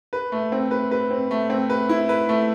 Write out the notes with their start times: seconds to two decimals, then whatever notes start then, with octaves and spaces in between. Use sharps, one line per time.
0.13 B4
0.32 A3
0.52 C4
0.71 B4
0.91 B4
1.11 C4
1.31 A3
1.50 C4
1.70 B4
1.89 E4
2.09 B4
2.29 A3